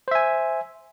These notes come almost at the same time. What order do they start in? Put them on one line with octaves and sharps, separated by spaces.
C5 E5 G#5